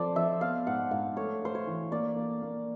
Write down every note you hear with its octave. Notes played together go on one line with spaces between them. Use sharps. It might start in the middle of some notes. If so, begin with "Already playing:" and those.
Already playing: F3 C4 A4 C5 D5
F3 E5
B3 F5
G#2 F#5
G#2 F5
A3 C#5
A3 C5
C#5
E3
A#3 D5
A#3
A#3